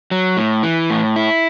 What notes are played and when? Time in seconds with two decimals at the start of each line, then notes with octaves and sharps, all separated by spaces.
0.11 F#3
0.37 A2
0.63 E3
0.90 A2
1.16 E4